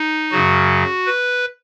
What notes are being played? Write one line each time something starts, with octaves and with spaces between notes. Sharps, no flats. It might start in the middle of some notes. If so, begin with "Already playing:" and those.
Already playing: D#4
F#2 C#3 F#3 F#4
B4